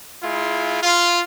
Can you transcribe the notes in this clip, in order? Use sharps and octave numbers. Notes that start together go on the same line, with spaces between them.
G#3 E4 F4
F4